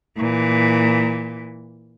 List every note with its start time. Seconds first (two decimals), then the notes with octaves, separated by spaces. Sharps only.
0.17 A#2 E3